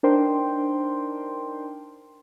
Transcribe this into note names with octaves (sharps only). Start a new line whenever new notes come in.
D4 D#4 A#4 C5 G5 C6